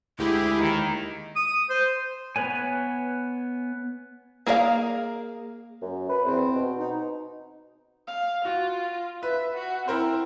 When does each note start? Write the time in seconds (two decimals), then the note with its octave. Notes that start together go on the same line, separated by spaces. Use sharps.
0.19 D2 G#3 E4 G4 G#4
0.59 D#2 D#3
1.36 D#6
1.70 C5
2.36 B3 B4 C#5 G#5
4.47 A#3 G#4 A#4 D5 F5
5.82 F#2
6.10 B4
6.25 E2 C4 C5
6.55 B2
6.78 D#4
8.07 F5
8.45 F4 F#4
9.23 B4 E5
9.54 F#4
9.88 C4 E4 A#4 C5